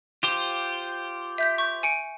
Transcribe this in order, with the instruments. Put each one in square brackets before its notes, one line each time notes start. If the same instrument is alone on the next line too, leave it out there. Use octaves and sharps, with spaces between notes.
[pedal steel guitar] F4 G4 C5
[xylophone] E5 G6 B6
C#6 G6
G#5 C#7 D7